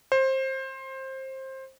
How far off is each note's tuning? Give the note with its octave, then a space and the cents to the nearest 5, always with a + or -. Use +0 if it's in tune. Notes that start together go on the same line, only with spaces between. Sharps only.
C5 +20